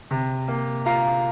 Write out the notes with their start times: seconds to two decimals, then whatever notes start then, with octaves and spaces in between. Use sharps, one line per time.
0.11 C3
0.48 A#3
0.86 F4 F5 A#5